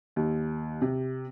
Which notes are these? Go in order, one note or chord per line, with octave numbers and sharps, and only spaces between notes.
D#2
C3